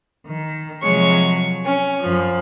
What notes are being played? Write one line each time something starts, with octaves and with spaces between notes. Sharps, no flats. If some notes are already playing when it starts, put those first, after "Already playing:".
D#3
C3 F3 F#3 G#3 C#5 C#6
C#4
F#2 F3